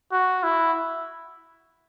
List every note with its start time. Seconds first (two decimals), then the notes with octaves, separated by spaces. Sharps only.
0.12 F#4
0.44 E4